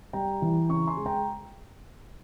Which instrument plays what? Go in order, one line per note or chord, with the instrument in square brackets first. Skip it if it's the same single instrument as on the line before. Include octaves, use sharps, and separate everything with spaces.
[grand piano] G3 G5 A#5
E3
C#3 A#5 C#6
G#5 C6
G#3
G5 A#5